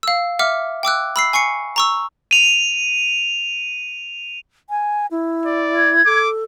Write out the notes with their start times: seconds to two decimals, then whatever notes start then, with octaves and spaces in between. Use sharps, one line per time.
0.03 F5 E6
0.39 E5 F#5 D6 F6
0.83 G5 D6 E6 F#6
1.16 B5 E6 C7
1.33 G#5 C#6 C7 C#7
1.76 A#5 C#6 E6
2.31 D#7 F7
4.70 G#5
5.11 E4
5.45 D5
5.76 G#6
6.06 A4 D6